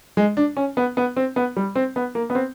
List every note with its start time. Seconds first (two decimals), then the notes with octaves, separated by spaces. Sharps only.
0.17 G#3
0.37 D4
0.57 C#4
0.77 B3
0.97 B3
1.16 C4
1.36 B3
1.57 G3
1.75 C4
1.96 B3
2.15 A#3
2.30 B3
2.35 C4